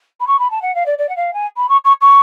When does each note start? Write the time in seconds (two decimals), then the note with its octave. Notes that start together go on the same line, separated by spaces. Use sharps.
0.20 B5
0.27 C#6
0.39 B5
0.51 A5
0.62 F#5
0.75 F5
0.86 D5
0.98 D5
1.09 F#5
1.16 F5
1.34 G#5
1.57 B5
1.69 C#6
1.85 C#6
2.01 C#6